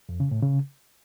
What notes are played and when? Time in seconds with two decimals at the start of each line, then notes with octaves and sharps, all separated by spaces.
0.09 F2
0.20 C#3
0.31 A2
0.43 C#3